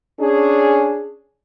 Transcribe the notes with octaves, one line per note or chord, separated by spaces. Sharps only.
C#4 D4 G#4